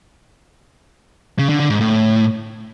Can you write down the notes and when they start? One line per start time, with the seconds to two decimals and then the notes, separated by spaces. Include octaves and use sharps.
1.39 C#3
1.49 D3
1.60 D3
1.70 G#2
1.81 A2